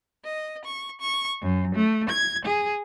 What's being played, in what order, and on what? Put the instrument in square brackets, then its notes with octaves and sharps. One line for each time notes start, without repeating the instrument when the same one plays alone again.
[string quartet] D#5
C#6
C#6
F#2
A3
G#6
G#4